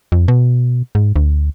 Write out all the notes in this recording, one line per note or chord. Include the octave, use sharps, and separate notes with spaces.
F2
B2
G#2
D2